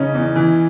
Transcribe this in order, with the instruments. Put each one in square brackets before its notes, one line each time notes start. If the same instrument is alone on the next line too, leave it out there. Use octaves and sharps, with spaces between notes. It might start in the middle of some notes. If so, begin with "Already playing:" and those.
Already playing: [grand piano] C#3 C#4 D#4
E2
E3